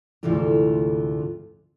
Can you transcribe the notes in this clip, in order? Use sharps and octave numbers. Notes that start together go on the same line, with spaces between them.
D2 G#2 C3 E3 A3 F4